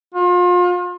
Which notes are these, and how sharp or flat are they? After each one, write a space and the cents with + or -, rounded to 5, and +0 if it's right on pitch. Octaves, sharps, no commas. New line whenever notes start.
F4 +35